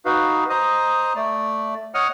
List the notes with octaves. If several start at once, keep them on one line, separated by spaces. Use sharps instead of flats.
D#4 F#4 B4 F5
C5 D#5 A#5 D#6
A3 D5
C#5 D#5 F#5 D#6 F6